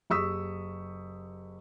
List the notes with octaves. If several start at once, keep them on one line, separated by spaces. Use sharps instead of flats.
F#1 G4 C#6 D#6 E6 B6